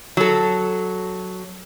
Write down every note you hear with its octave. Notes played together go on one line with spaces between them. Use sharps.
F#3 A4